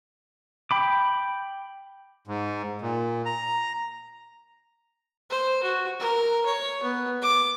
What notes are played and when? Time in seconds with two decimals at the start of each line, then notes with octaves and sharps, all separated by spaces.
0.71 G5 B5 D6
2.28 G#2
2.82 A#2
3.26 A#5
5.30 C5
5.63 F#4
6.00 A#4
6.45 C#5
6.83 B3
7.22 D6